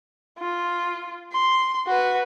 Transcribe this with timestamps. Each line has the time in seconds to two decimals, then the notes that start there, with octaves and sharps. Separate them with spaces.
0.39 F4
1.32 C6
1.87 F#4 B4